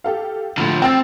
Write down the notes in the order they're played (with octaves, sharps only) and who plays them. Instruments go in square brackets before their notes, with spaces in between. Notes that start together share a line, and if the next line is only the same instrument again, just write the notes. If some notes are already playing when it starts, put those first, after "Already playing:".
[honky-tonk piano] G4 A4 F5
[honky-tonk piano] A2 B5 [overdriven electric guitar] D3 F3
[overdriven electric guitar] C4 [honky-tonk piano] G5 E6 A6